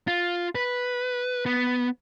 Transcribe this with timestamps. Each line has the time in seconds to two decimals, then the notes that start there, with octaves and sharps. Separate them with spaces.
0.07 F4
0.55 B4
1.46 B3